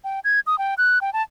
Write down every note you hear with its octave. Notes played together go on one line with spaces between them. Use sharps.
G5
G#6
D#6
G5
F#6
G5
A5